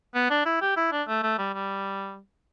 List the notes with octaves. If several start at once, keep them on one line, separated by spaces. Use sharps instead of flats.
B3
D4
E4
G4
E4
D4
A3
A3
G3
G3